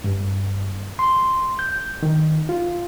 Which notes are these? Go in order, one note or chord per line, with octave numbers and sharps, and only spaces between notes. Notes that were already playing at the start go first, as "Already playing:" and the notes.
G2
C6
G6
D#3
F4